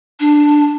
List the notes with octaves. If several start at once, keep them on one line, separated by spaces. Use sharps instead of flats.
D4